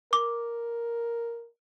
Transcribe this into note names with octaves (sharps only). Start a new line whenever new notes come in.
A#4 D6